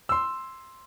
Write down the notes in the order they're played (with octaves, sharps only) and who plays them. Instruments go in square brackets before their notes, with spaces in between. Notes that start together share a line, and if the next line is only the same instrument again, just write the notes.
[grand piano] C6 E6